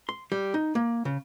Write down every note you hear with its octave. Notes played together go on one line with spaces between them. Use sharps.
C6
G3
D#4
A#3
C#3